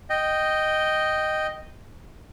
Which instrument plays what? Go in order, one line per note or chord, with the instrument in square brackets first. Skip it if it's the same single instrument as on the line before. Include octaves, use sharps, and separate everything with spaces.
[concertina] D#5 G5